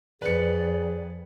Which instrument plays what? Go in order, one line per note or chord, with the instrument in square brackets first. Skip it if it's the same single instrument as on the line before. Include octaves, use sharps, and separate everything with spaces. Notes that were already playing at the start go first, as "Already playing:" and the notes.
[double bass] F2 [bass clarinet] G#4 [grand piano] B4 C#7 [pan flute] D5